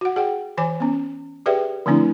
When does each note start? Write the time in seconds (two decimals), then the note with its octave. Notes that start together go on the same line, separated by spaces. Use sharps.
0.01 F#4 F#5
0.16 G#4 F#5 G5
0.57 E3 C#5 G#5 D6
0.80 B3 C#4
1.46 G4 G#4 B4 D5 E5 G5
1.86 D3 F3 A3 C4 D4 E4